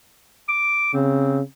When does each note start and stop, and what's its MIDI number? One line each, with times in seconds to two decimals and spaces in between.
0.49 0.91 86
0.94 1.41 49
0.94 1.42 60